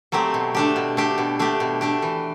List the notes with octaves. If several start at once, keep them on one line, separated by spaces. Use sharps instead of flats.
F#3 A3 C4 G4
B2
A3 D4 G4
B2
A3 D4 G4
B2
A3 D4 G4
B2
A3 D4 G4
E3